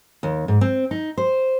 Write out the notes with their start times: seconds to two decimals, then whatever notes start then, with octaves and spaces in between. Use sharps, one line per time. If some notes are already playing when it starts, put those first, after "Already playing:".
0.23 D#2
0.48 G#2
0.61 C4
0.91 D#4
1.18 C5